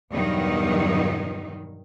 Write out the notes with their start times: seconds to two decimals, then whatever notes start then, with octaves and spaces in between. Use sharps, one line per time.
0.12 E2 G2 B2 D#3 F#3 D#4